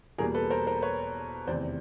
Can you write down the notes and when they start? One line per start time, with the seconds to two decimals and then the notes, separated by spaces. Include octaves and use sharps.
0.18 E2 B2 G3 A#3 G#4 A#4
0.34 A4 B4
0.50 A#4 C5
0.67 A#4 C5
0.82 B4 C#5
1.47 F1 E2 C3 D#3 C5 D5